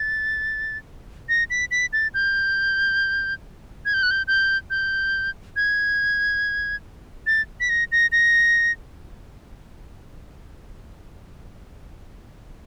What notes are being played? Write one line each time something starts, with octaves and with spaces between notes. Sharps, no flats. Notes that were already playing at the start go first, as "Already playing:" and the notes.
Already playing: A6
A#6
B6
B6
A6
G6
G#6
G6
F#6
G6
G6
G6
G#6
A6
B6
A#6
A#6
A#6